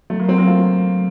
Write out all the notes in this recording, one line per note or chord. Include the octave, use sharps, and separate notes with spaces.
F#3 A3
A#3
F#3 C4
A#3
A3 F4